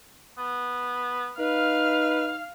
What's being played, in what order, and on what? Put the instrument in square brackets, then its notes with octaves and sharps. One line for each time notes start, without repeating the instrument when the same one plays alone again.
[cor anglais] B3
[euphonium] D#4 [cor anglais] B4 [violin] F5 F6